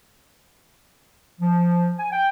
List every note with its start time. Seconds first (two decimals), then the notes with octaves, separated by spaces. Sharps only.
1.40 F3
1.98 G#5
2.12 G5